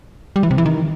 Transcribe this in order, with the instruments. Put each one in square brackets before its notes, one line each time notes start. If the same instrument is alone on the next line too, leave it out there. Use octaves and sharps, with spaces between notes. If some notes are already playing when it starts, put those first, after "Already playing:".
[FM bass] G3
E3
C3
E3
D#3